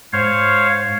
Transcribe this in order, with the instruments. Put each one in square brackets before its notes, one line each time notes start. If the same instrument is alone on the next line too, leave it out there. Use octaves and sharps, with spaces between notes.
[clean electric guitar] G#2 [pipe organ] C5 C#5 F5